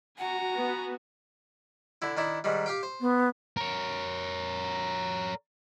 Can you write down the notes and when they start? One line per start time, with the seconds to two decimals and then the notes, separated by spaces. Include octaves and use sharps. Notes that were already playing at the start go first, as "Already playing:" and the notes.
0.18 F#4 F#5 G#5 A#5
0.54 B3
2.02 D3 E4
2.17 D#3 D4 E4
2.44 G#2 D#3 G3
2.66 G4 F5 G5
2.83 C5
3.01 B3
3.57 A#4 C#5